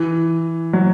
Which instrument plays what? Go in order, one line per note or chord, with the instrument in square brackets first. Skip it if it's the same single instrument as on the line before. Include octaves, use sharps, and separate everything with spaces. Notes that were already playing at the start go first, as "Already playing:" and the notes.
Already playing: [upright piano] E3
F#3